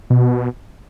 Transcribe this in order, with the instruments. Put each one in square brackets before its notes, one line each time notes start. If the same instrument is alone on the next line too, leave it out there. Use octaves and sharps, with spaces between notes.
[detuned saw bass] B2